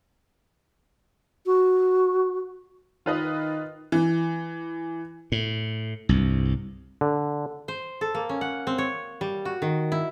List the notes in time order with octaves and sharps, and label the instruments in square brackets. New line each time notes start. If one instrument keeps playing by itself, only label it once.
[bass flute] F#4
[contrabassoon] D#3 [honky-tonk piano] F4 B4 D#5
[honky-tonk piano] E3
[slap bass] A2
C2 G2
[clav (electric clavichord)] D3
[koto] C5
A4
A#3
C#4
F#5
C4
C#5
G3
F#4
D#3
E4